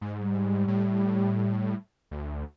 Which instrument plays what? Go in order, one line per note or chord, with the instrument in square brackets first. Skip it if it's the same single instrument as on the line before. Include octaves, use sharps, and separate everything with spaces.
[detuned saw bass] G#2
[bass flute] G3
[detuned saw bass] A2
D2